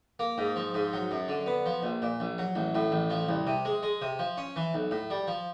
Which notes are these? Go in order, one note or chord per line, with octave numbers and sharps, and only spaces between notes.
A#3
G#2
F3
G#2
F#3
F#2
D3
B3
F3
A#1
A#2
A#1
F#3
A1
A2
A1
F3
C2
C3
G#3
G#3
C3
F3
C#4
E3
B1
A2
G3
F3